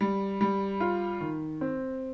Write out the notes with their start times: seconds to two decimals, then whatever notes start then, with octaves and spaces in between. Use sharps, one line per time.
0.01 G3
0.41 G3
0.80 F4
1.21 D#3
1.61 C4